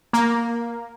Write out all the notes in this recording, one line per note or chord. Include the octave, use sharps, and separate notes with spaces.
A#3